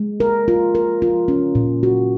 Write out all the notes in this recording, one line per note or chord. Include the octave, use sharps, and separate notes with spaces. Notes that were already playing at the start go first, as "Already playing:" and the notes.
Already playing: G#3
A#4
F4
A#4
F4
C#4
A#2
F#4